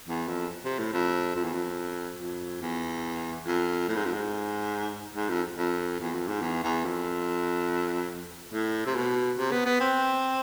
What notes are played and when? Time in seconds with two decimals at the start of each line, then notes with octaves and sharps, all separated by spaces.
0.08 E2
0.28 F2
0.65 C3
0.79 A2
0.93 F2
1.35 F2
1.44 E2
1.54 F2
2.19 F2
2.62 E2
3.46 F2
3.88 A2
3.96 G#2
4.05 F2
4.13 G#2
5.15 G#2
5.29 F2
5.57 F2
6.00 E2
6.14 F2
6.27 G#2
6.41 E2
6.64 E2
6.85 F2
8.53 A2
8.86 C3
8.95 B2
9.38 C3
9.52 B3
9.66 B3
9.80 C4